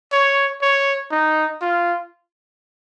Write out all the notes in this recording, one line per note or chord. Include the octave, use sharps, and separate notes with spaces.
C#5
C#5
D#4
F4